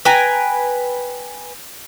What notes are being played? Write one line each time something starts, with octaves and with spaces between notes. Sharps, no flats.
B4 G5 G#5 A#5